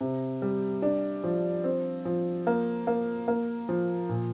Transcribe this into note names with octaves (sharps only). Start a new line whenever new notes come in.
C3
G3
D4
F3
C4
F3
A#3
A#3
A#3
F3
A#2